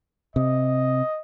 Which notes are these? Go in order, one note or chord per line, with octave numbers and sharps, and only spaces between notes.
C3 D#5